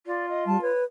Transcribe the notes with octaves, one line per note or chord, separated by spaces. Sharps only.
F4 D5
D#5
G3 A5
B4 C#5